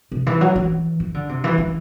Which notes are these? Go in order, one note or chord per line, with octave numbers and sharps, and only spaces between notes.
C3
E3
F#3
E3
E3
D3
C3
E3
E3